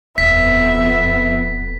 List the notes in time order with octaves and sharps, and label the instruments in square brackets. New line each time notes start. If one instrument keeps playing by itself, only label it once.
[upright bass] D#1 [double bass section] F2 B3 [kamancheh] E5 [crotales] B6